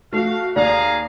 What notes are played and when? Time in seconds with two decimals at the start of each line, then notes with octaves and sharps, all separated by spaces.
0.13 A3 F#4 F5
0.56 D#2 G#4 D5 F5 A#5